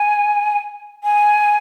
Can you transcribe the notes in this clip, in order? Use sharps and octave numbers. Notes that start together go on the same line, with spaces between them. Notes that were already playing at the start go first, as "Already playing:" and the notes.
Already playing: G#5
G#5